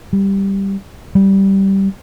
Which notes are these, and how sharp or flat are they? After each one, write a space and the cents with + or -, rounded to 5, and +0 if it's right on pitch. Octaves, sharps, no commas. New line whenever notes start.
G3 +5
G3 -10